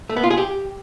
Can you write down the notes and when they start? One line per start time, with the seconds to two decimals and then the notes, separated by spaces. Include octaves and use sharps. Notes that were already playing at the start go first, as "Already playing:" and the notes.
0.09 A3
0.16 B3
0.23 F4
0.30 G#4
0.37 G4